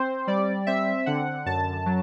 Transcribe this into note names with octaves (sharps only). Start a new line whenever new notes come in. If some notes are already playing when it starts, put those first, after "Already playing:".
Already playing: C4 C5
G3 D5
C4 E5
D3 F#5
F#2 A5
F#3